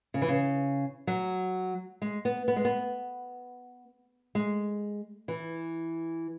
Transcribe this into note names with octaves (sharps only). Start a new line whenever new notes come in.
C#3
E3
C#3
F#3
G#3
B3
B3
G#3
B3
G#3
E3